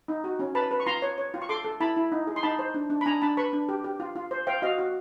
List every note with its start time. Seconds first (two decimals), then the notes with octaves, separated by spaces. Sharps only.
0.08 D#4
0.24 F#4
0.39 C#4
0.55 B4 A5 B5
0.71 B4
0.80 C#6
0.86 F4 A#5 C6
1.02 C#5
1.18 C#5
1.34 F4
1.42 C#6
1.49 A4 C6 D6
1.65 A4
1.80 E4 A5 B5
1.96 E4
2.12 D#4
2.27 G#4
2.36 C6
2.43 D#4 A5 B5
2.59 C5
2.74 D4
2.90 D4
3.01 B5
3.06 D4 G#5 A#5
3.22 D4 A5 B5
3.37 B4 B5 C#6
3.53 D4
3.69 G4
3.84 G4
4.00 F4
4.16 F4
4.31 C5
4.47 C5 F5 G5
4.62 F#4 D#5 F5
4.78 F#4